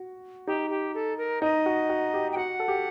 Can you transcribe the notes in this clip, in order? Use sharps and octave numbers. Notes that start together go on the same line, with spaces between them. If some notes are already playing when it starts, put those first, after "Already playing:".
Already playing: F#4
D#4 G4
G4
A4
A#4
D#4 D#5
F#4
F#4
G4
G5
F#4 F#5
A4
G4